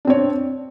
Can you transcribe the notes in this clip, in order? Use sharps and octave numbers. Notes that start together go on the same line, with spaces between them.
C4 D4 C#5